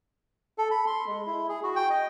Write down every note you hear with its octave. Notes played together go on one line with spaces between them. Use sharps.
A4
B5
C6
G#3
E4
G#4
F#4
G5
D#5